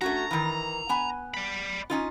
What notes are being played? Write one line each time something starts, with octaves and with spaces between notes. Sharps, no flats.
A3 C#4 F#4 A#5
D#3 E3
B3 G#5
D5 B5
C#4 D#4 F4